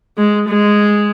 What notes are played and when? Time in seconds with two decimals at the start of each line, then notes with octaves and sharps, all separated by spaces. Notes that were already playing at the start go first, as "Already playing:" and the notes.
0.18 G#3
0.48 G#3